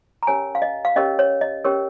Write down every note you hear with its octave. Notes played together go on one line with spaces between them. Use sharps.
A#5
C#4 G4 A#4 C#5 G#5
F5
D#5
F5
C#4 G4 A#4 C#5 D#5
C#5
D#5
C#4 G4 A#4 C#5